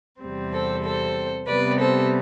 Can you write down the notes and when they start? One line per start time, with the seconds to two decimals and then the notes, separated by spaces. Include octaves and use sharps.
0.21 E2 C3 G3 C4
0.52 A4 C5
0.83 A4 C5
1.47 C3 G3 B3 B4 D5
1.79 A4 C5